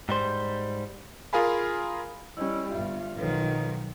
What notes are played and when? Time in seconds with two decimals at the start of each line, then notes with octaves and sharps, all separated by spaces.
0.09 G#2 G3 C5
1.33 F4 G#4 A#4 F5 G#5 B5
2.37 G3 C#4 E4 D#5 E6
2.72 G1 G2 F4 E5
3.18 B1 D#3 F3 F#3 A4 B4 C#5